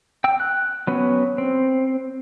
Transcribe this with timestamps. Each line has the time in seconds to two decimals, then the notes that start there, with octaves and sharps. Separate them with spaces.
0.24 G5 E6
0.40 F#6
0.87 F#3 B3 C#4
1.38 C4